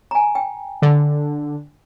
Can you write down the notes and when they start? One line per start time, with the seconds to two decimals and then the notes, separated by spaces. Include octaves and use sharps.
0.11 G#5 A#5
0.35 G5
0.82 D3